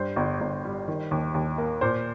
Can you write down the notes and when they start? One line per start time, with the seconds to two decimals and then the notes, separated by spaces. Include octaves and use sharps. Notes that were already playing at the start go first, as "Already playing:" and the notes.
Already playing: G2 C5
0.16 G1
0.41 G1
0.65 G3
0.88 D#3
1.11 D#2
1.34 D#2
1.58 A#3
1.81 A#2 C5